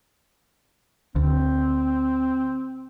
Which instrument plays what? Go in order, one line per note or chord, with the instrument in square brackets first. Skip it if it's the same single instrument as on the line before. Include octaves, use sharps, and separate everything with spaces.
[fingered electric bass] D2 [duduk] C4